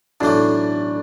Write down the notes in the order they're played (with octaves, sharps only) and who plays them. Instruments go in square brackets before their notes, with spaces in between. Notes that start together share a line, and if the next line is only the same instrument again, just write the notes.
[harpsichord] B1 A2 E3 A3 [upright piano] D4